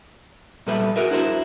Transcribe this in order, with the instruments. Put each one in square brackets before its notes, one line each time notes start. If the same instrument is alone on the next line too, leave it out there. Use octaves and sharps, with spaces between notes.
[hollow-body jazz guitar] A#2 G3 A4 B4 E5 B5
F#4 G#4 A#4 B4 E5
D4 E4 F#4 A#4 C5